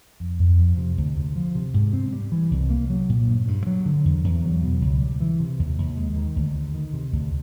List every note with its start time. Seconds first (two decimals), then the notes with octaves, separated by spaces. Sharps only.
0.20 F2
0.39 F2
0.59 F3
0.78 C3
0.97 D2
1.16 D2
1.36 F3
1.55 C3
1.74 G#2
1.93 C4
2.12 G3
2.32 E3
2.51 C2
2.70 A#3
2.90 F#3
3.09 A#2
3.28 G2
3.48 G2
3.67 F#3
3.86 D3
4.05 E2
4.24 E2
4.44 F#3
4.63 B2
4.81 C#2
5.01 G3
5.20 E3
5.40 C3
5.59 D#2
5.78 D#2
5.97 G#3
6.16 D#3
6.36 D2
6.55 D2
6.75 D#3
6.93 C3
7.12 D2